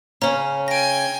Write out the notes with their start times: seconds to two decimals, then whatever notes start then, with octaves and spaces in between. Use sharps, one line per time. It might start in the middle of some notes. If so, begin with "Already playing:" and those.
0.22 C#3 C#4 C#5 A#5
0.68 G5 G#5 A#6 D7